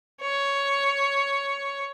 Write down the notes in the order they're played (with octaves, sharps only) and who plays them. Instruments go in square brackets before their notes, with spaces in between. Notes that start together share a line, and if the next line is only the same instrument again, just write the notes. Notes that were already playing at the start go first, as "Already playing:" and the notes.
[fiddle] C#5